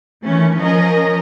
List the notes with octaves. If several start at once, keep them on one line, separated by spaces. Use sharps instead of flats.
D#3 E3 A3 C#4
F3 C#4 A#4 D#5